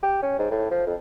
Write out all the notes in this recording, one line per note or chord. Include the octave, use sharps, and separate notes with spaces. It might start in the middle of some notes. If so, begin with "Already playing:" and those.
G4
C#4
G#2
A2
F3
F2